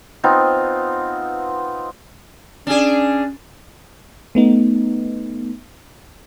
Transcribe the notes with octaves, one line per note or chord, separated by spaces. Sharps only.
B3 C4 D#4 F4
C#4 D4 G#4
A3 B3 D#4